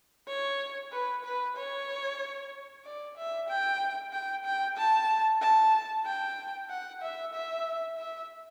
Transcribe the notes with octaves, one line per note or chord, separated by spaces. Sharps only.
C#5
B4
B4
C#5
D5
E5
G5
G5
G5
A5
A5
G5
F#5
E5
E5
E5